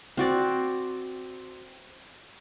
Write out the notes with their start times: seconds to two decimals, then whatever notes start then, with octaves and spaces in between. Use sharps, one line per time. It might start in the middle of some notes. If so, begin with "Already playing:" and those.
0.17 C4 F#4 D5